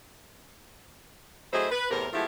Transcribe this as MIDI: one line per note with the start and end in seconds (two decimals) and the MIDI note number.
1.53 1.67 54
1.53 1.67 57
1.53 1.67 64
1.53 1.67 68
1.53 1.67 72
1.53 1.67 75
1.71 1.88 71
1.91 2.08 40
1.91 2.08 45
1.91 2.08 48
1.91 2.08 70
2.13 2.26 53
2.13 2.26 56
2.13 2.26 57
2.13 2.26 59
2.13 2.26 64
2.13 2.26 67